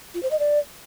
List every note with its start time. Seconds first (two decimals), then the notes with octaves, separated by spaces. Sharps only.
0.14 F4
0.23 C5
0.31 D#5
0.39 D5